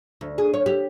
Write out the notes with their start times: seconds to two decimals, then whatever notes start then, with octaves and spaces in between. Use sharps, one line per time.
0.21 D2
0.38 G#4
0.54 C#5
0.66 G4